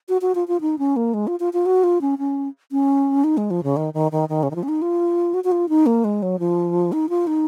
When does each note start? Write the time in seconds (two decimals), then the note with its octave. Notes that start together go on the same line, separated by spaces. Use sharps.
0.09 F#4
0.22 F#4
0.35 F4
0.48 F4
0.61 D#4
0.79 C#4
0.96 A#3
1.14 G#3
1.27 F4
1.40 F4
1.53 F4
1.66 F#4
1.84 F4
2.01 C#4
2.19 C#4
2.72 C#4
3.24 D#4
3.37 G#3
3.51 F3
3.63 C#3
3.77 D#3
3.94 D#3
4.12 D#3
4.29 D#3
4.43 C#3
4.51 D#3
4.55 F3
4.63 C#4
4.68 D#4
4.82 F4
5.34 F#4
5.44 F#4
5.52 F4
5.69 D#4
5.86 A#3
6.04 G#3
6.22 F#3
6.39 F3
6.92 D#4
7.09 F4
7.27 D#4